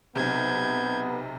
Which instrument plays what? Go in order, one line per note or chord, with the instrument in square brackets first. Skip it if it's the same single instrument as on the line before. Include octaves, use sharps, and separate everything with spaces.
[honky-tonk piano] B1 C3 [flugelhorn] B3 [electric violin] G6 G#6